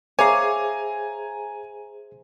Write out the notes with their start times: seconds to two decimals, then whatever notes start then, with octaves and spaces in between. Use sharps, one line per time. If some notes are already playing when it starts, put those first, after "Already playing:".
0.19 G#4 C5 C#5 E5 F5 G#5 A#5 D6